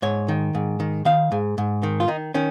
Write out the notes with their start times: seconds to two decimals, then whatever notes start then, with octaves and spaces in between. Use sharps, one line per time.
0.02 G#2 C#5
0.28 D#3
0.55 G#2
0.80 D#3
1.05 D#3 F5
1.32 G#2
1.58 G#2
1.83 D#3
2.00 F4
2.08 D#3 D#4
2.34 D#3 C#4